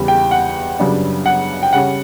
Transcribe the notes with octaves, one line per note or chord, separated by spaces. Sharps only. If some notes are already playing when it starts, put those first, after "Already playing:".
Already playing: E2 C#3 G3
G5
F#5
F#2 C#3 G3 B3 D4
F#5
G5
C#3 G3 C#4 F#5